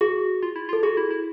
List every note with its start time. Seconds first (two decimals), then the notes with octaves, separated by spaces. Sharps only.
0.01 F#4 G#4
0.43 F4
0.56 E4
0.69 F4 A4
0.83 F#4 G#4
0.97 E4
1.11 E4